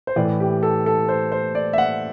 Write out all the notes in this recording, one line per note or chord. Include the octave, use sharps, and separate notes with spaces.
C5
A2 E3 D5
G4
A4
A4
C5
C5
D5
E5
F#5